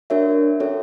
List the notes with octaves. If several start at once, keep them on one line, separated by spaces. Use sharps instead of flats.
D4 F#4 A#4 C#5 E5
C#4 F#4 A4 C#5 E5